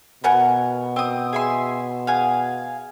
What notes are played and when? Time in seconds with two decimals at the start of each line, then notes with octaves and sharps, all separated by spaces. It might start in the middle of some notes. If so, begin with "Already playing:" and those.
0.24 B2 A#4 B4 F#5 G#5
0.96 C4 D#6
1.33 G#4 E5 C6
2.07 G#4 F5 F#5